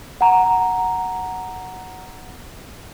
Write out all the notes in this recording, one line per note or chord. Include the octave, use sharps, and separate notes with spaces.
F#5 A#5